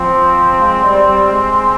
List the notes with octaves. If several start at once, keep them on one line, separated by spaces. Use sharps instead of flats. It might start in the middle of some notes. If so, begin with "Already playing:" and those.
Already playing: F3 C4
G#3
G3
G3
G#3